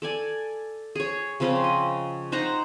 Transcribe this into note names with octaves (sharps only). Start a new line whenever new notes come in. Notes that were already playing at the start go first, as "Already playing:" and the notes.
A4 D5 G#5
G#4 C#5
C#3 F3 C4 C#4
D#5
D#4 C5 F#5 A#5